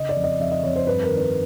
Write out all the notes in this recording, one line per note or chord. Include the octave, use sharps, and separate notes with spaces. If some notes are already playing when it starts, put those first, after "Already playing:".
Already playing: C#3 D#5
D5
F2
D#5
F2 E5
D#5
F2 C#5
C5
G2 B4
A#4
D#3
B4